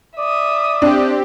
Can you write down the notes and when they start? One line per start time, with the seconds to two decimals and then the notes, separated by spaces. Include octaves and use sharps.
0.18 D5 E5 D#6
0.82 C4 D4 G4